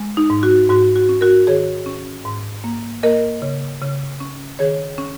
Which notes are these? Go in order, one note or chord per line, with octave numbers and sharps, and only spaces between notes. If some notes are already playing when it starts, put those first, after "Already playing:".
Already playing: G#3
D#4
G#2
F#4
G#2 F#4
F#4
C#4
F#4 A#4
D#3 G#4 C#5
C#4
G#2
A#3
A#3 A#4 D#5
C#3
C#3
C#4
D#3 G#4 C#5
C#4